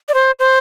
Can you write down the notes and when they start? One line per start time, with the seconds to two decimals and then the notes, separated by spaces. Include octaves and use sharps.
0.09 D5
0.14 C5
0.39 C5